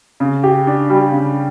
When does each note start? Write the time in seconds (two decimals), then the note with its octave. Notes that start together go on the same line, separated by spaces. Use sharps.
0.20 C#3
0.44 G4
0.67 D4
0.90 G3
1.12 C#3